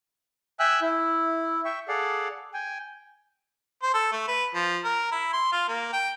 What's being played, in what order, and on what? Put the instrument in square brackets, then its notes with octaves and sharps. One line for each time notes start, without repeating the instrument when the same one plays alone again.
[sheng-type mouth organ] E5 G5 G#5 E6 F#6
E4
E5 G5 C#6
G#4 A4 D5 F5 F#5
G5 G#5
[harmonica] C5
A4
A3
B4
F3
A#4
E4
C6
F4
A#3
G5